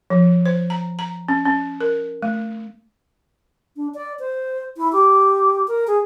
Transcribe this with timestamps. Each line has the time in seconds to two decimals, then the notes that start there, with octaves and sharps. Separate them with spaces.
0.10 F3
0.46 C5
0.70 A#5
0.99 A#5
1.29 C#4
1.45 C#4
1.81 A#4
2.22 A3
3.76 D4
3.94 D5
4.20 C5
4.77 E4
4.93 G4
5.68 A#4
5.87 G#4